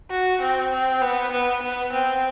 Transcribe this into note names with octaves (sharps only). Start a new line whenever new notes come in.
F#4
C4
C4
B3
B3
B3
C4